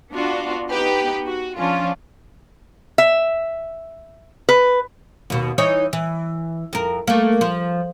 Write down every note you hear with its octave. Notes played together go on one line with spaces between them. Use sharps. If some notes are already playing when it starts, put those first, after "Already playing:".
B3 D4 F4 F#4
B3 D#4 G4 B4
F#4
F3 C#4 D4 F4
E5
B4
D#2 B2
E3 D#4 C#5
E3
F2 A#4
A3 A#3
F3